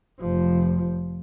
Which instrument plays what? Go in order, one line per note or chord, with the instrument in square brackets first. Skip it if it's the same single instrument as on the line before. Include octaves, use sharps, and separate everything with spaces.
[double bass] F1 F3